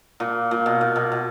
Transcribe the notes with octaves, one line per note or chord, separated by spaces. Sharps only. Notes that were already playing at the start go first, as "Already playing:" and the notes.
A#2
A#2
B2
A#2
B2
B2